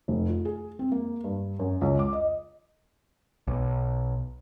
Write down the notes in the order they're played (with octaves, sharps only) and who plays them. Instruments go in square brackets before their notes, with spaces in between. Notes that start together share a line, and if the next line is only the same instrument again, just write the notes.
[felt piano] F1
F4
G#4
C4
A#3
G2
F#2
C#2
D6
D#5
[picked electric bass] B1